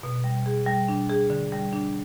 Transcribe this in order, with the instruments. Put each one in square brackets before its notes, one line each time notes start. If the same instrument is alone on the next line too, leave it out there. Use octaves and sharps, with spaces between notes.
[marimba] B2
G3
G#4
G3
D4
G#4
D3
G3
D4